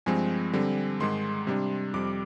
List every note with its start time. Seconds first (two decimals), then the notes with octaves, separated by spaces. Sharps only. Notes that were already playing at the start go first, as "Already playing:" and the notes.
0.06 G2 F3 G#3 C4 G#5
0.53 D3 G3 C4
1.00 G#2 D#3 G#3 C6
1.47 C3 G3 D4
1.94 F2 C3 G3 D6